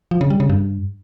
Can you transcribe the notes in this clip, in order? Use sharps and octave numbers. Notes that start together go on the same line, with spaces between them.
F3
C#3
G3
C#3
G2